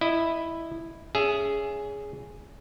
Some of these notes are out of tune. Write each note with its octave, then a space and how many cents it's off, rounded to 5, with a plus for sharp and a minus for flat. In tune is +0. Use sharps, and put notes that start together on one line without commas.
E4 +0 D#5 -15
C#4 +30 G#4 +0 E5 +15